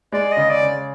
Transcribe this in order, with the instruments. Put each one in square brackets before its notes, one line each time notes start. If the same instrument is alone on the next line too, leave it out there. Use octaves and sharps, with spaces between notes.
[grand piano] G#3 [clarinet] D5
[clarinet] D#5
[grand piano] C#3
[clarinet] D5
[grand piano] C#3